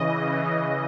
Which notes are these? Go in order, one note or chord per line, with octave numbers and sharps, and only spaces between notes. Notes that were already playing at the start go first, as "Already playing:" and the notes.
Already playing: C#3 E3 D#5